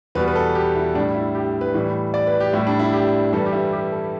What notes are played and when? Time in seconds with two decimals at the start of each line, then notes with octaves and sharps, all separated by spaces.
0.15 E2 B2 G3 B4
0.28 B4
0.35 A4
0.55 G4
0.76 E4
0.94 A2 D4
0.98 G3
1.14 E4
1.35 G4
1.61 B4
1.74 A2 E3 G3
2.14 D5
2.27 B4
2.40 G4
2.53 A2 G3 E4
2.67 D4
2.79 E4
2.93 G4
3.33 G2 E3 G3 A4
3.46 G4
3.52 E4
3.72 G4
3.92 A4